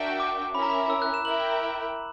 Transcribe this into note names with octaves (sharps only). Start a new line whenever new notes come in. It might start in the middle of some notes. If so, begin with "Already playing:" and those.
Already playing: D4 F#4 A#4 E5 G5
D6
C#4 E4 A#4 E5 B5
A#5
B5
E6
F#6
E7
E4 A#4 E5 G5 F#7